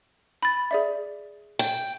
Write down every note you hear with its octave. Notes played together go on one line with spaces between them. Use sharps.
B5 A6
G#4 D5 E5
G5